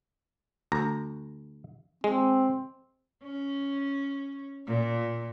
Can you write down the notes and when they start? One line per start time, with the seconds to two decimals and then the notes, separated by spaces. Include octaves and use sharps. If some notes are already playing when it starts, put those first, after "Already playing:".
0.72 D2 A#5
2.04 G#3 C4
3.24 C#4
4.66 A#2